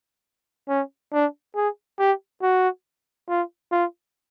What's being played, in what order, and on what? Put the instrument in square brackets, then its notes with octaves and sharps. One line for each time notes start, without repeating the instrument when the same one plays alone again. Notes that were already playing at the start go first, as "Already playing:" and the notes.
[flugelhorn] C#4
D4
G#4
G4
F#4
F4
F4